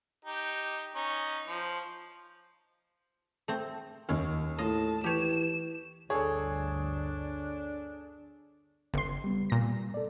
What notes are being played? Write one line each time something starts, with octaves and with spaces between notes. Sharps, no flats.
D#4 G4
C#4 D#4
F3
A3 C4
D#2 C#4
A2 F4 D#5 A5
E3 G4 C#5 E7
G1 D2 D3 D4 G#4 A4 C#5
G1 C#3 C6
G3 B3
A#2 A#6
A4 D5